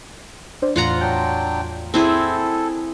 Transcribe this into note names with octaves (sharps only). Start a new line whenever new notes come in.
D4 C5 D5
E2 A2 F4 F#5 A#5
F#3 D4 G5
C4 E4 G#4 A4